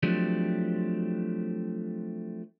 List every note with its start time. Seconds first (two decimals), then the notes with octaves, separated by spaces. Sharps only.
0.03 F3 F#3 A3 C4 D4 G4